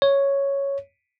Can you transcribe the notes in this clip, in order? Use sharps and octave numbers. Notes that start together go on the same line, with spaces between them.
C#5